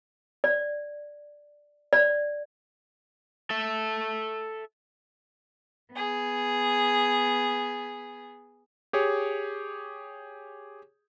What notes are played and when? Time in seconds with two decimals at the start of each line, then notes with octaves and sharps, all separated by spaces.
0.44 D5
1.93 D5
3.50 A4 E5
5.93 B3 G#4
8.93 G4 G#4 C#5